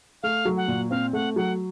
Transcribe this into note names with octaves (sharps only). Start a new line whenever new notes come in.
A3 F5
F#3
F#5
A#2
C4 F5
A3 F#5
F#3 F#5